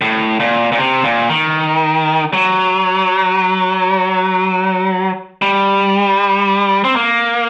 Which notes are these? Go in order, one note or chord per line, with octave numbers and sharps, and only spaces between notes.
A2
A#2
A#2
C3
A#2
D#3
F#3
G3
C4
A#3